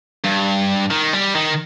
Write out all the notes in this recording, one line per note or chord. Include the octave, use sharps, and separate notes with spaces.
G2
D#3
G3
D#3